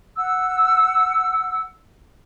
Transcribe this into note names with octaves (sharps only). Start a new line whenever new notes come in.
F#5 E6